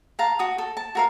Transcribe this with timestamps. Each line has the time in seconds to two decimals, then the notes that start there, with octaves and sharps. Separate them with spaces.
0.19 F5 A5 A#5
0.39 F#4 D#6
0.58 A4
0.77 A5
0.95 F#4 A#4 F5